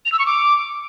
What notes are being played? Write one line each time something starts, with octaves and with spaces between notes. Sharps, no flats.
F7
E6
C#6
D6